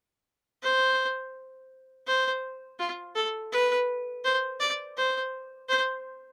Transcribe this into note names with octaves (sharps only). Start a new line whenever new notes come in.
C5
C5
F4
A4
B4
C5
D5
C5
C5